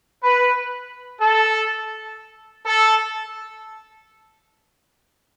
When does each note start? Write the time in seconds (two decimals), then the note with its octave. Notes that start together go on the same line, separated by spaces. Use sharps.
0.24 B4
1.21 A4
2.65 A4